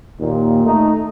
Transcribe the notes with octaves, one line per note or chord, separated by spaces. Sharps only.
D#2 A#2
A3 D#4